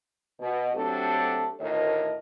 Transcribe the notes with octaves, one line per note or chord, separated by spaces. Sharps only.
B2
F#3 A3 C4 D4 G4 A4
D2 A2 D#3 A#4 C#5 D#5